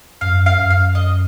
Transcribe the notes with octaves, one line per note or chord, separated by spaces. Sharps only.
F#2 F5
F5
F#2
F5
D#5